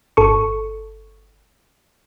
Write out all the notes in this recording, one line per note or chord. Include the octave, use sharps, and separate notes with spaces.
G1 A4 C#6